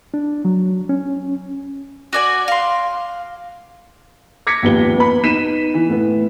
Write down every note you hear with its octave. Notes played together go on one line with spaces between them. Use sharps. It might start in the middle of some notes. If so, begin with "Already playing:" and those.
D4
F#3
C#4
F#4 D5 G#5
F5 C6
D6 G#6 A#6 B6 C#7
G#1 D#2 F3 B3 G4 G7
B3 B4 B5
B3 D#4 B6 D#7 E7
E3
A2 B3